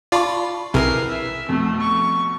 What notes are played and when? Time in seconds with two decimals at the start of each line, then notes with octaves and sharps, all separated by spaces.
0.12 F4 D5 A5 B5 C#6
0.74 B1 C3 E4 G#4 A#4 B4 C7
1.09 E5
1.49 F2 B2 A3
1.81 C#6